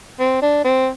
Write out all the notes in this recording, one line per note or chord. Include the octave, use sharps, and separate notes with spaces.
C4
D4
C4